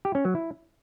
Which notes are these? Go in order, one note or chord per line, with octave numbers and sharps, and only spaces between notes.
G4
C#4
F#3
E4